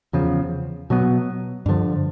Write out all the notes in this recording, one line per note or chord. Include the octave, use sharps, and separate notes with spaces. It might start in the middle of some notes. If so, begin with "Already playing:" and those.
E2 C#3 F3
B2 F#3 B3
G2 D3 F3